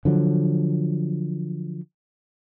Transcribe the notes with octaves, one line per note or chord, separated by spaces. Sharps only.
D3 F3 F#3